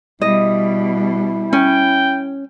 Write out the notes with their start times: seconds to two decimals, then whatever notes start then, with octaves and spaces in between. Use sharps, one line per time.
0.22 B2 G3 E4 D#5
1.53 C#4 G5